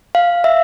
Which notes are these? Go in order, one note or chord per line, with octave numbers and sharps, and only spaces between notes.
F5
E5